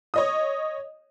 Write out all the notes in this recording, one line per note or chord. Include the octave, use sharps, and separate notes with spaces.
C#5 D#5 D#6